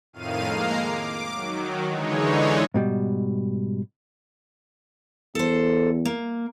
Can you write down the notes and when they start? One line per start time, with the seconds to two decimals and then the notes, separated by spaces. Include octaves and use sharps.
0.13 F2 A2 D#3 F5 D#7
0.46 G#3 A#3 F5 A#5 C7
0.82 D6
1.33 D#3 F#3
1.88 D3 E3 G#3 D#4 C#5
2.74 G#2 B2 G3
5.35 E2 A4 C5
6.05 A#3